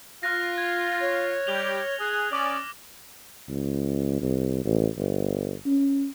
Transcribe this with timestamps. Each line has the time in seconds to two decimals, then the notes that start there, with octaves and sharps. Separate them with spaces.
0.23 F4 F6 F#6 A#6
0.58 G#6
1.00 C#5
1.47 G3 G4 F7 G7
1.99 G#4 F#6
2.32 C#4 D5 D6 D#6 F#7
3.49 C#2
4.21 C2
4.65 A1
4.97 G1
5.66 C#4